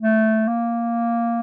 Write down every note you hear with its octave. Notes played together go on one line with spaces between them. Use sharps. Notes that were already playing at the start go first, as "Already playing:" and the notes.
A3
A#3